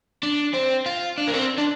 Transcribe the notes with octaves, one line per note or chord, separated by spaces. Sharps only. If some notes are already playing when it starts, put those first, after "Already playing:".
D4
C4
F4
D4
A#3
C4
D4